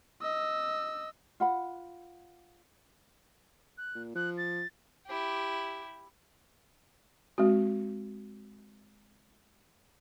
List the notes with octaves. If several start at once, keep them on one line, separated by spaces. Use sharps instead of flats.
D#5 E6
F4 F#5 B5
F#6
A#2
F3 F#6
A6
E4 G4
G#3 C4 F#4